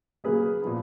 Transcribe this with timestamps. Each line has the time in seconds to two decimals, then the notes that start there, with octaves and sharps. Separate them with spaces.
0.24 C#3 F#3 A#3 G#4 B4
0.62 A#2 F3 B3